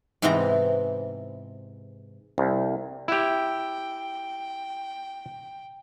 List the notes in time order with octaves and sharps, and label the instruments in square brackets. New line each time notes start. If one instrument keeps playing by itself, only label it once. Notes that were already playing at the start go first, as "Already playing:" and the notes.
[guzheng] G#2 C3 E3 B3 C4 A#5
[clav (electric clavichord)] C2
[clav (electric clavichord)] E4 G4 [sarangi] G5